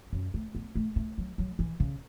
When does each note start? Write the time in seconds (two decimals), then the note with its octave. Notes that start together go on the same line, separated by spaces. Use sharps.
0.13 F#2
0.34 A3
0.55 B3
0.75 A3
0.96 A3
1.18 F#3
1.38 F#3
1.59 E3
1.80 C#3